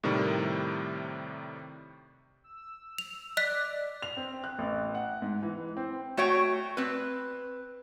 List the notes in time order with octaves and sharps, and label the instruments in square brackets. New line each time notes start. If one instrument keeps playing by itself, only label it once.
[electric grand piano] A2 C3 D#3 G3
[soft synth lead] E6
[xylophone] F7
[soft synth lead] D5 [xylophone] D#5 F#6 B6
[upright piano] F7
C4
F#6
A1
F#5
G#2
E3
C4
[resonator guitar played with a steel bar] A3 F#4 C#5 G5
C4 B4